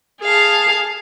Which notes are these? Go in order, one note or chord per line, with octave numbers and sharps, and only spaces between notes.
G#4 F5 A5